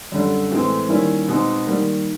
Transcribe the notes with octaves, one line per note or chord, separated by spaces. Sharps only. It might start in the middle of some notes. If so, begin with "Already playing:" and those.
F#2 D3 G3
A2 E3 G#3 C4
D#3 G3 A#3 C#4 E4
B2 G#3 C4 D#4
D#3 G3 A#3